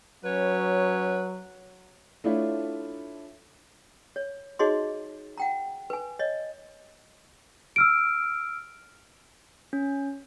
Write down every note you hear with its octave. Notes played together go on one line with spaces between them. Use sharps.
F#3 C#4 B4 C#5
A3 D4 E4 F4 C#5
C#5
D#4 F#4 G#4 C#5 D#5 C6
F#5 G5 A#5
B4 G#5
C#5 D#5
E6 F6 D7
C#4